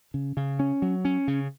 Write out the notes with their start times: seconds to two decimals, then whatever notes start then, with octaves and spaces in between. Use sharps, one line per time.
0.14 C#3
0.37 C#3
0.59 C#4
0.82 F#3
1.05 C#4
1.28 C#3